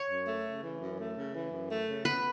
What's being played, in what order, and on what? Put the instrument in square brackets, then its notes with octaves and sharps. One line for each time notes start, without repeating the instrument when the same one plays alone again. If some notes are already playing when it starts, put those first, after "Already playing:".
Already playing: [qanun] C#5
[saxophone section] F#2
A3
C#3
E3
F#2
A3
C#3
E3
F#2
A3
C#3
[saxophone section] B3 [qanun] B4